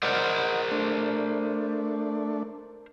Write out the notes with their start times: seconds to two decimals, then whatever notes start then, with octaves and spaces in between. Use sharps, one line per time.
0.03 A#4 C5 D5 D#5 F#5
0.71 A3 D4